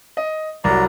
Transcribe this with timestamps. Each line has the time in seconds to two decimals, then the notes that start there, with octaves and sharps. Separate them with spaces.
0.17 D#5
0.64 C2 F#3 D5 A#5